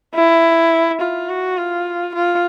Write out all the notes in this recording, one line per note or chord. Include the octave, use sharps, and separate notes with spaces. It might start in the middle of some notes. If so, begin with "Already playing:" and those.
E4
F4
F#4
F4
F4